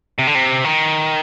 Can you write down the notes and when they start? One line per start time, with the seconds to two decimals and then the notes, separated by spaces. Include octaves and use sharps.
0.19 C3
0.27 D3
0.35 C3
0.65 D#3